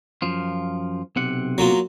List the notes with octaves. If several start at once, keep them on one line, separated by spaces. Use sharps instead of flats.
F#2 F3 F4
B1 C3 F#5
F#3 A#3 F4